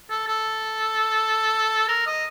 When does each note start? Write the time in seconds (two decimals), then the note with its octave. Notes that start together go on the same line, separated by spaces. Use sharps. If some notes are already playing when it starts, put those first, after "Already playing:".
0.10 A4
0.28 A4
1.89 A#4
2.07 D#5